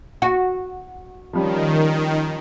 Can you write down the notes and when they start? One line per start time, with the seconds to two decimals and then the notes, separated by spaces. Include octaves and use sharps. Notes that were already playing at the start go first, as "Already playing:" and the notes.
0.22 F#4
1.33 D#3 F3 G3 C#4